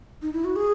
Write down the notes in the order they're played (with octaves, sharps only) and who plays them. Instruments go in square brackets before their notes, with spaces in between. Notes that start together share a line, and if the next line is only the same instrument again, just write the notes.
[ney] D#4
E4
F#4
G#4